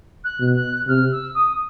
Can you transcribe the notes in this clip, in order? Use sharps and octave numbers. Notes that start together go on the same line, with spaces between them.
F#6
B2
F#6
C3 F6
E6
D#6